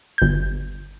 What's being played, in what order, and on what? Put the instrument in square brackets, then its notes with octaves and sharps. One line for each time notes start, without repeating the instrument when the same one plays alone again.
[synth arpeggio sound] G1 G6